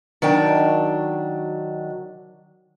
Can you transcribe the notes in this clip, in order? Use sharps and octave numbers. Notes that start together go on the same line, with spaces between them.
D#3 F#3 D4 G5